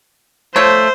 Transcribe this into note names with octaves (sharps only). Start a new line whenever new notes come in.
F3 A3 C5 C#5